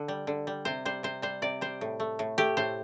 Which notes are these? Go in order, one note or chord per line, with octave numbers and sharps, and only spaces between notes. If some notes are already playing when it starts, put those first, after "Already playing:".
Already playing: D3
G3
D3
G3
C3 C5
G3 C5
C3 C5
G3 C5
C3 D5
G3 C5
A2
A3
A2
A3 G4
A2 C5